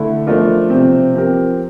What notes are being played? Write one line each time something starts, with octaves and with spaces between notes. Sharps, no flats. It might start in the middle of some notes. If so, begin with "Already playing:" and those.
Already playing: D3 A3 E4
F3 A3 D4 F4 A#4
C3 F3 C4
F3 C4 G4 A#4